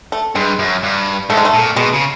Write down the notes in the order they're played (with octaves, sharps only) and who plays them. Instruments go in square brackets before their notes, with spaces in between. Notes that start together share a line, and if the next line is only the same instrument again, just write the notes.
[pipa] A3
[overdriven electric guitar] G2 [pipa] G#3
[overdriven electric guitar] F#2
G2
[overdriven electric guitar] G#2 [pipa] A3
[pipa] G#3
A3
[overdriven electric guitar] A#2
[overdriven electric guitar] B2 [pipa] G#3
[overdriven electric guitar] C#3